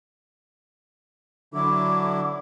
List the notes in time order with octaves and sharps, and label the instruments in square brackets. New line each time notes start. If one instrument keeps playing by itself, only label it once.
[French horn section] D3 [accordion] F#3 E4 [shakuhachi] D6